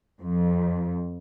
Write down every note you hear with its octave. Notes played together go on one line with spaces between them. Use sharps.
F2